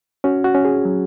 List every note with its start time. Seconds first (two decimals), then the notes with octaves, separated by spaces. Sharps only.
0.24 C#4 F#4
0.44 F#4
0.55 C#4
0.65 G#4
0.85 F#3